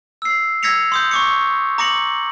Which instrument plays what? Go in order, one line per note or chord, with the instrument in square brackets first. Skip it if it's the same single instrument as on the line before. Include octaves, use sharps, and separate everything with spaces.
[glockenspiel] E6 C7
E6 G#6 A#6 B6 C#7 F7
C6 D#6 G6
C#6 D6 C#7
A#5 D6 A#6 C#7 F#7